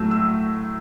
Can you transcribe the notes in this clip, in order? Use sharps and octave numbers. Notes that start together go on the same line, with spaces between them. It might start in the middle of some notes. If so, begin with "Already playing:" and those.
Already playing: A2 F#3 A3 E6
E6